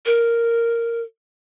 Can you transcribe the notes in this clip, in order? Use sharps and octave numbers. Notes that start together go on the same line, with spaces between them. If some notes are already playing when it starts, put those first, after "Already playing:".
A#4